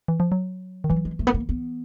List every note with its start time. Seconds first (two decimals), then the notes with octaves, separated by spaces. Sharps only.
0.08 E3
0.20 F3
0.32 F#3
0.84 D#3
0.90 E3 F#3
1.05 G#3
1.19 A3
1.27 B3
1.34 A#3
1.49 B3